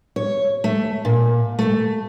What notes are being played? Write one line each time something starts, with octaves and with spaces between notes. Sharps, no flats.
C#5
A3
A#2
A3